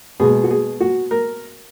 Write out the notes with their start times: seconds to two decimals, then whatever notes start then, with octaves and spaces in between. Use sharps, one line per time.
0.20 B2 G#3 G#4
0.44 F#4
0.51 G#4
0.80 F#4
1.11 A#4